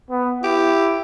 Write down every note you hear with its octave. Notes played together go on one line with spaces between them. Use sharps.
B3
E4 G4